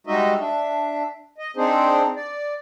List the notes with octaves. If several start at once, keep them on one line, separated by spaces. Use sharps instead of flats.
G3 G#3 D#4 F#4 D#5 E5
D4 E5
D#5
C4 D4 D#4 G#4 C5
D5